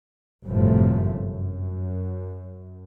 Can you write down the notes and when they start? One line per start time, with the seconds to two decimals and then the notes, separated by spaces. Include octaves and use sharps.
0.46 G1 F#2 A2 C3 F3 A3
1.19 F#2